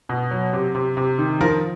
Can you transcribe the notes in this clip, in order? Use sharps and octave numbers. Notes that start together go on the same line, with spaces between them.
B2
F#3
C3
C3
C3
D#3
F3 A#4